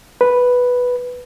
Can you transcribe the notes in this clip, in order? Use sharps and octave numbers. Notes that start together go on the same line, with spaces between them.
B4